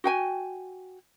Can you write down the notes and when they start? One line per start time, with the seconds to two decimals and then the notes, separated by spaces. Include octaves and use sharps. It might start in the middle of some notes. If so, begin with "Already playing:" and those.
0.04 F#4 G5 G#5